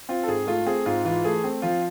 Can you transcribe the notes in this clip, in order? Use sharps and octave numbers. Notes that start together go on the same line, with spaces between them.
C4 F4
A4
G#2 G#4
A3 F4
C4 G#4
G#2 F4
E3 F4
A3 G#4
C4
F3 F4